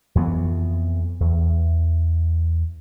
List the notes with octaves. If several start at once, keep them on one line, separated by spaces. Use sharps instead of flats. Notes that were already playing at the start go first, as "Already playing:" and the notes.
F2 E3 B3
E2